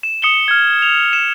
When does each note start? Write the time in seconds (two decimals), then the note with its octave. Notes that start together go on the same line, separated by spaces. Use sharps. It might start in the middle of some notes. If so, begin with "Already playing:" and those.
0.03 E7
0.22 D#6 C#7 E7 G7
0.48 F6 G#6
0.82 F7
1.13 E7